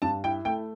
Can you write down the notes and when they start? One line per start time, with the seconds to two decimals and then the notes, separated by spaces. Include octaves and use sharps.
0.02 G2 A5
0.24 E4 G5
0.45 A3 G5